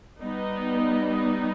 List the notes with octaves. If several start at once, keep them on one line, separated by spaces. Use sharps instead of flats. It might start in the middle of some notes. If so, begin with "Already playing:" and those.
G3 B3 D#4